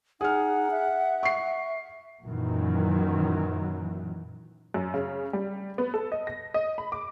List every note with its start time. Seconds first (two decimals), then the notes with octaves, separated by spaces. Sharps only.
0.21 D#4 G#4 F#5 F6
0.71 E5
1.23 C#6 C7
2.24 F#2 A#2 D#3 E3 F#3
4.74 F#2
4.94 C#3
5.33 G3
5.78 B3
5.94 A4
6.12 D#5
6.27 A#6
6.54 D#5
6.78 B5
6.92 D6